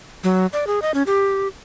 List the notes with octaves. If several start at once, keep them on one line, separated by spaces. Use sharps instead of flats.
F#3
D5
G#4
D#5
C#4
G4